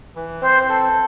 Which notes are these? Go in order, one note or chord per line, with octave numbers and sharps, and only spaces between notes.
E3
C4 C5
A4